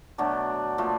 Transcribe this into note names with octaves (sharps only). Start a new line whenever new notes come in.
B2 F#3 A3 D4
A#2 F3 A3